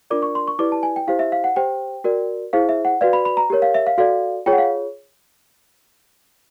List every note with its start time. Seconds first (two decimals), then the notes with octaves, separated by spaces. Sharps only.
0.10 D4 F4 A#4 D5 D6
0.22 C#6
0.35 C6
0.48 C#6
0.59 E4 G4 B4 D5 D6
0.72 A5
0.83 G#5
0.96 G5
1.07 E4 G4 C5 F5
1.19 E5
1.32 F5
1.44 F#5
1.56 G4 C5 G5
2.04 F#4 A#4 D5
2.53 E4 G#4 C5 F5
2.69 E5
2.85 F#5
3.01 F#4 B4 D5 F5
3.13 B5
3.25 B5
3.37 A#5
3.50 G4 A#4 C#5
3.62 F5
3.74 E5
3.87 F5
3.98 F#4 A4 D5 F5
4.46 F4 G#4 C#5 G5
4.53 F#5
4.58 F5